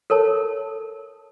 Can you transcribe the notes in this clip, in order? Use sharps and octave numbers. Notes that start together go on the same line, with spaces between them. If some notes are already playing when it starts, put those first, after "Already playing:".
A4 A#4 C#5 A5